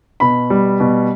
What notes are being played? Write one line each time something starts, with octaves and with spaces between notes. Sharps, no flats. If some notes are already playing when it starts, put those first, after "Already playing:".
B2 B5
G3
B2